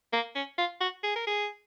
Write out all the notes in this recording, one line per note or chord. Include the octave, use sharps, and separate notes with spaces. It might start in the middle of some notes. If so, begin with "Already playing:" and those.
A#3
C#4
F4
F#4
G#4
A#4
G#4